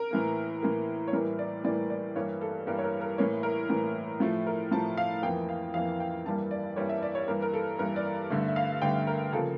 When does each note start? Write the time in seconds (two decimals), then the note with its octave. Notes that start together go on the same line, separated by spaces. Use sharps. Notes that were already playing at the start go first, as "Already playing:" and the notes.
Already playing: A#4
0.11 A2 E3 A#3
0.62 A2 E3 A#3
1.08 C#5
1.13 A2 E3 G3 A#3 A#4
1.39 D5
1.64 A2 E3 G3 A#3 D5
1.90 D5
2.16 G2 E3 G3 A#3 C#5
2.41 A4
2.67 G2 E3 G3 A#3 A#4
2.78 C#5
2.84 A#4
3.01 A#4
3.18 A2 E3 A#3 C#5
3.43 A#4
3.69 A2 E3 A#3
4.20 A2 F3 A3
4.47 A#4
4.71 A2 F3 A3 A5
4.97 F5
5.23 F2 E3 A#3 G5
5.49 F5
5.74 F2 E3 A#3 F5
6.00 G5
6.26 G2 E3 G3 A#3 A5
6.51 D5
6.76 G2 E3 G3 A#3 C#5
6.89 E5
7.03 D5
7.15 C#5
7.28 G2 E3 A#3 A#4
7.42 A#4
7.53 A4
7.79 G2 E3 A#3 A#4
7.96 D5
8.30 G2 D3 A3
8.48 E5
8.56 F5
8.82 G2 D3 A3 G5
9.07 A#4
9.33 C#3 F3 A#3 A4